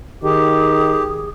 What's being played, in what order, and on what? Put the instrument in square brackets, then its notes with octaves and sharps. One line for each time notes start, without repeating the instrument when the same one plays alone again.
[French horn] D#3 [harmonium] G4 [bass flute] G#4